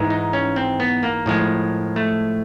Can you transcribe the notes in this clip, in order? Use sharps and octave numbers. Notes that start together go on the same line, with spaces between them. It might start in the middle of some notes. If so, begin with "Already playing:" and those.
Already playing: G#2 E3 G#3
D#4
C#4
C4
B3
A#3
A2 F3 G#3
A3